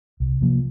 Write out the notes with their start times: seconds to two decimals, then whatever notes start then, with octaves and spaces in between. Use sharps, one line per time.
0.20 C2
0.41 C3 F3 A#3